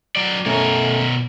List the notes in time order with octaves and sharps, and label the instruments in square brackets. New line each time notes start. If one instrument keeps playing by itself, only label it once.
[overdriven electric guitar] F#3 D5
[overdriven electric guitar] B2 A#4 [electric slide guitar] A3 C#4